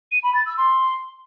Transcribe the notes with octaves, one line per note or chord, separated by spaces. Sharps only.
D#7
B5
A6
E6
C6